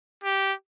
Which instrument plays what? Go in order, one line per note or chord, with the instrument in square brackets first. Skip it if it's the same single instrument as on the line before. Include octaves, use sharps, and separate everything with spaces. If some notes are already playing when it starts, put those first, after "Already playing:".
[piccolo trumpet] G4